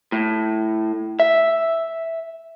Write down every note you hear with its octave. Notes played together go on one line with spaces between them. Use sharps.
A2
E5